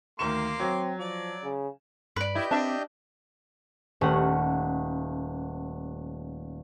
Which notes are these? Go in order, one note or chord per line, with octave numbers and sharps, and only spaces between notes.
D2 D#3 A#3 C6 D6 E7
F#3 C4
F3 D5
C#3
G2 B4 D5
E4 G4 D#5 G6
C4 D4 E5
D#1 A3 C#4 F#5